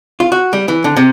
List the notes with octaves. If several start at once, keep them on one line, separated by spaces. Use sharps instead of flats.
F4
F#4
G3
E3
D3
C3